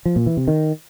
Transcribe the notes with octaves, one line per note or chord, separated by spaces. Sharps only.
F3
A#2
E3
C3
D#3